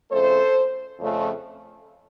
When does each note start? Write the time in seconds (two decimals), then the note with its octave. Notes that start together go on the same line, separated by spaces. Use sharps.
0.11 F2 C#3 A3 A4 C5
1.00 F2 C#3 A3